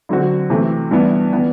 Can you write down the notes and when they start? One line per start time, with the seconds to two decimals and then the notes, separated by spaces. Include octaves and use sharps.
0.09 D3 F#3 C4 F#4
0.50 C3 E3 A3
0.91 G2 E3 B3 E4
1.33 E3 B3